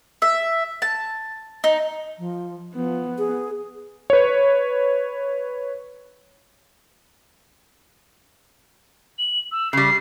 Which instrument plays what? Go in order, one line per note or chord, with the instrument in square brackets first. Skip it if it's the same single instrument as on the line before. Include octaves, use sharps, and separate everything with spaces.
[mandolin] E5
A5
D#4
[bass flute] F3
[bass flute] F3 [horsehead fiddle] B3
[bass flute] G#4
[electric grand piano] B4 C#5
[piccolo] F#7
E6
[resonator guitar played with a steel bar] C#3 G3 [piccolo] C7